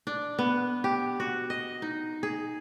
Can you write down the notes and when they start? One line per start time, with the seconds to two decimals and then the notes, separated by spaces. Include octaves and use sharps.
0.07 D4
0.39 B3
0.84 G4
1.20 F#4
1.50 D#5
1.82 D#4
2.23 G#4